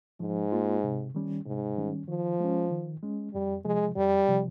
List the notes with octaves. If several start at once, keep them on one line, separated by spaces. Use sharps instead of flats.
G#2 F3
A#3 F4
C3
D#3 G3 C#4
G#2 C3
D#3 G3 C#4
D#3 F3
G#3 C#4
D#3
G#3 C#4
F2 G3
C3 F3 G#3
F2 G3
C3 F3